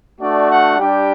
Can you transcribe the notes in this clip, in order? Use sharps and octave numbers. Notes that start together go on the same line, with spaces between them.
A3 D4 F#4 D5
F#5
G3 D4 G4 G5